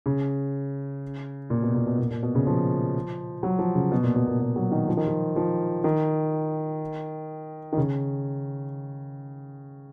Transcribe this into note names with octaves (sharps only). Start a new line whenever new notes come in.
C#3
A#2
B2
A#2
B2
A#2
A#2
B2
C#3
F3
F#3
F3
C#3
B2
A#2
B2
A#2
B2
F#3
D#3
F3
D#3
F3
F3
D#3
D#3
C#3